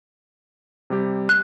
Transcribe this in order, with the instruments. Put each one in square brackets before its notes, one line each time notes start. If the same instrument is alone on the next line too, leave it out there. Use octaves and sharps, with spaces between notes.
[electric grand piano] C3 G3 G4
[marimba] F#6